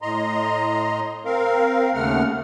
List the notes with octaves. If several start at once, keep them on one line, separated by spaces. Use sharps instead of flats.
A2 D#5 A#5 C6
C4 A#4 F5
D#2 C#3 A3 F#5 F6